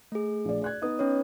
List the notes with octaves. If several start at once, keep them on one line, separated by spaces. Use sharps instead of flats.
A3 G#4
A#1 D5
D5 F#6 G#6
B3 D#4 D#5 D#6
C#4 B4 C#5